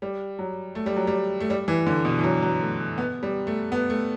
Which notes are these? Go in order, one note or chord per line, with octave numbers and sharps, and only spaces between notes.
G3
F#3
A3
G3
F#3
G3
A3
G3
E3
D3
B2
E3
F#3
F#3
A3
B3
G3
A3
B3
A3